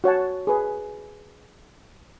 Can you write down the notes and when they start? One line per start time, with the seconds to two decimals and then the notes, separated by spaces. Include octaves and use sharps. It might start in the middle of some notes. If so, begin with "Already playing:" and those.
0.04 F#4 C#5 F#5 A5
0.47 G#4 B4